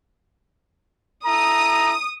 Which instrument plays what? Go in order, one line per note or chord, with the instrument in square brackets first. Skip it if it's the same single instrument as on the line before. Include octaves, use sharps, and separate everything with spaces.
[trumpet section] E4 A4 A#5 [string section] D#6